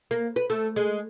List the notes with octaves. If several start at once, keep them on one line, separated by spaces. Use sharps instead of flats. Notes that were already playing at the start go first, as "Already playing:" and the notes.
A#3
B4
A3
G#3